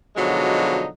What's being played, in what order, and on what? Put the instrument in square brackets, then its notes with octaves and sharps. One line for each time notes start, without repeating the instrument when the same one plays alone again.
[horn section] B2 D3 F3 F#3 G#3 D#4